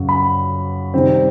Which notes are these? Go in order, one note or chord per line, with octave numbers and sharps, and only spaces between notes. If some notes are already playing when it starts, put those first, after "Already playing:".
Already playing: F#2 C#3 F#3
B5
C3 D#3 G3 C4